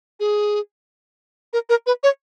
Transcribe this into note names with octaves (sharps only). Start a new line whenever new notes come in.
G#4
A#4
A#4
B4
C#5